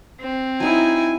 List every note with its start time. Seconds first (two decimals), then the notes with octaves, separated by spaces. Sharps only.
0.20 C4
0.60 F#3 D#4 E4 G#5